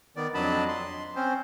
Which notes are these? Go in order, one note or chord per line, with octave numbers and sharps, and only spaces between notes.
D#3 B3 D5
F2 F#3 D4 D#5 A5 B5
C6
C4 C#4 C5